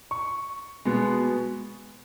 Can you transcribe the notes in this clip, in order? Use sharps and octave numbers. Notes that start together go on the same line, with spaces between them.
C#6
B2 G#3 B3